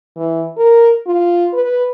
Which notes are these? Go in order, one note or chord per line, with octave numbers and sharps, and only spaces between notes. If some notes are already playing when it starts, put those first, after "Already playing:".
E3
A#4
F4
B4